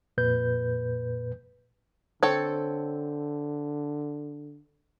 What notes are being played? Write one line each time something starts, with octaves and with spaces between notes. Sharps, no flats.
F2 A#2 B4 G6
D3 C4 A4 C#5